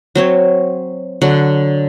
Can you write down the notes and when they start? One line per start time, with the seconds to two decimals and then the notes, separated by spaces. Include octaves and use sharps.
0.15 F#3 C4 C#5
1.21 D3 F#3 F#5